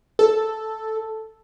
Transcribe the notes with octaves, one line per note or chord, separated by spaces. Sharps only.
A4